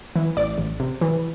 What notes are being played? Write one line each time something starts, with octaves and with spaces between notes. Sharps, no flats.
E3
A1 D5
A1
C3
E3